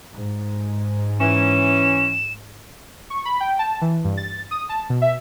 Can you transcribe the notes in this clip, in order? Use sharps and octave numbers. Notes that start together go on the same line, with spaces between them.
G#2
E3 C#4 E7
C#6
B5
G5
A5
E3
G2
A6
D#6
A5
B2
E5